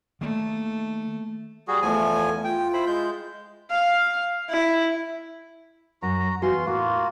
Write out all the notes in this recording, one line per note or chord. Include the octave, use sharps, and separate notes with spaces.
D#3 A3 A#3
G3 F#4 G#4
E2 F3 A3 G#5
F4 G5
E4 C5 B5
G#3 G6
F5
E4
F#2 F#4 A#5
E2 F4 F#4 G#5 C6
A2 A#3 F4 F#4